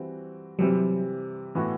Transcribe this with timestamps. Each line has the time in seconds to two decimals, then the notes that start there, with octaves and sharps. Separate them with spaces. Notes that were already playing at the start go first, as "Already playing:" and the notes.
Already playing: E3 G3 C4 F#4
0.59 C3 E3 F#3 G3 C4
1.55 A2 E3 B3 F#4